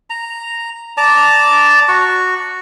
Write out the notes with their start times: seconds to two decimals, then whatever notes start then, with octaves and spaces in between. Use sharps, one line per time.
0.10 A#5
0.97 D5 A5 A#5 D6
1.88 F#4 C#6